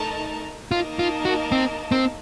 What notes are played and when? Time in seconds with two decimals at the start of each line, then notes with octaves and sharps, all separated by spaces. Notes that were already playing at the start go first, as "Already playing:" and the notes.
Already playing: A3 D#4 A#4 D#5 A5
0.71 A#3 D#4 F4 A#4 D#5 A5
0.99 F4
1.25 F#4
1.52 C4
1.92 C4